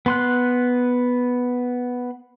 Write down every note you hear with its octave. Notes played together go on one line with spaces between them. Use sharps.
B3 C6 F#6